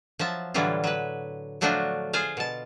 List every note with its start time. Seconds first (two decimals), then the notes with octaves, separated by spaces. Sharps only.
0.19 F3 F#3 E5 A5
0.54 A2 D3 E3 F#3 G3 F4
0.84 F#3 B4
1.61 F3 F#3 A3 D4 F4 F#4
2.13 F4 G#4 C5 F5
2.37 B2 A5